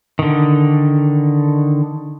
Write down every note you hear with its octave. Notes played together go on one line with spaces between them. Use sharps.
D3 D#3